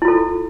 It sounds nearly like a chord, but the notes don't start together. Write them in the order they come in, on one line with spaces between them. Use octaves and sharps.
E4 F4 A4